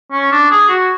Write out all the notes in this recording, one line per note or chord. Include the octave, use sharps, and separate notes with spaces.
C#4
D4
G#4
F#4